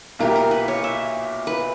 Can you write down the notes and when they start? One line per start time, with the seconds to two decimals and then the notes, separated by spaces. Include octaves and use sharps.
0.19 B1 A#2 A#3 E4 G4 A#4
0.36 A#4
0.51 B4
0.68 C#5
0.84 E5
1.47 B4